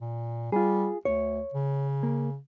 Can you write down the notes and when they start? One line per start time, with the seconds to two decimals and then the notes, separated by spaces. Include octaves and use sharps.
0.01 A#2
0.52 G3 F4 G#4
1.05 D2 C#5
1.54 C#3
2.03 A#3